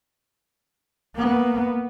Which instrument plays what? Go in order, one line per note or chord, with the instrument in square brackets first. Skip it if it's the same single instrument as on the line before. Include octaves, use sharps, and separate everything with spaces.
[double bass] A#3 B3